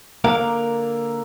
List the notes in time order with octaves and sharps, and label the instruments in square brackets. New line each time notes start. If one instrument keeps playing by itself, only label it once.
[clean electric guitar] D3 A#3 A#4 F5